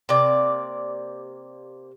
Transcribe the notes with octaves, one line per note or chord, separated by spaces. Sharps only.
C3 A#3 D5